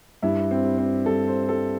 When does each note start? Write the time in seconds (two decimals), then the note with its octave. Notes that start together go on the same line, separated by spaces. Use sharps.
0.23 G2 E4
0.51 C4
0.64 G3
0.78 C4
1.06 G2 A4
1.28 C5
1.49 G3 A4